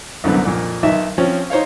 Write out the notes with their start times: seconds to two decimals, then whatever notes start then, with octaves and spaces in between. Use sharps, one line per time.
0.24 C2 F#2 D3 B3
0.45 F2 A#2
0.83 B1 D#3 E5
1.18 F3 C4 C#4
1.50 D#4 C5 C#5 F5